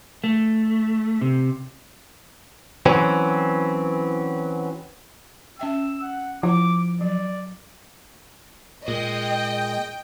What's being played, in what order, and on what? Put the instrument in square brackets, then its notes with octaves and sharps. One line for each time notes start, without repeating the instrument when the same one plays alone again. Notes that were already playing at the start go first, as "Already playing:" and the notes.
[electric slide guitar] A3
C3
[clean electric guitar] E3 F#3 C4 C#4
[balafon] C#4 E5 G5 [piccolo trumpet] E6
[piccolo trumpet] F#5
[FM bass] F3 [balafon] E4 [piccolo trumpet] D6
[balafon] F#3 [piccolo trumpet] D5
[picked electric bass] A#2 [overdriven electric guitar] G#3 [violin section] D#5 [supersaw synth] G5